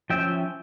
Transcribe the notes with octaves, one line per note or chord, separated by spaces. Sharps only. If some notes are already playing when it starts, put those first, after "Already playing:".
F3 C#4 E5 G5